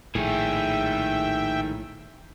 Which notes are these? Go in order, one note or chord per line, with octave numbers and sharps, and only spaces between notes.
A#1 A2 D#3 G#4 E5 G5